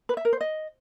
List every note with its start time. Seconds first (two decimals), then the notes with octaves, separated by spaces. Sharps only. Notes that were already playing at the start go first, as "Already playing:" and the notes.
0.09 B4
0.17 E5
0.25 A#4
0.33 C5
0.41 D#5